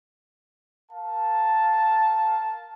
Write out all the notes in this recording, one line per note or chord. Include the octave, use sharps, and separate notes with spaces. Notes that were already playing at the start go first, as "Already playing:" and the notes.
A#4 F5 A5